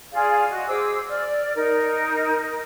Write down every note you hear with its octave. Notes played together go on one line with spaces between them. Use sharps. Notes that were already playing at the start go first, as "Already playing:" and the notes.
F4 G#4 D5 F5
F#4 D#5
G#4 C5 D6 E6
D5 F6
D#4 A#4